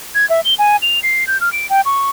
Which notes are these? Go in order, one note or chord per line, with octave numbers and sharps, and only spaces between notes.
G#6
E5
G7
G#5
F7
C7
G6
F6
D7
G5
C#6